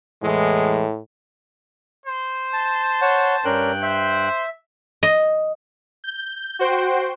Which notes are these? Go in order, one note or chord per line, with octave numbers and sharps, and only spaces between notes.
E2 A2 E3 G#3
C5
A5
C#5 F#5
G2 C#4 D4 A#4 G5 F#6
C5 E5
D#5
G6
F#4 C5 G5 C6